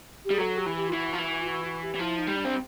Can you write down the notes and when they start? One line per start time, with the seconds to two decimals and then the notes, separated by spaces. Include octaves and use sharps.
0.24 G4
0.30 G3 G#4
0.38 F#3 A4
0.57 G4
0.66 E3
0.75 G4
0.87 F4
0.92 E3 F#4
1.13 F3
1.19 E3
1.42 F4
1.46 F#4
1.64 F#4
1.82 G4
1.95 E3
1.99 F3 E4
2.18 D#4
2.27 G3
2.36 D4
2.45 C4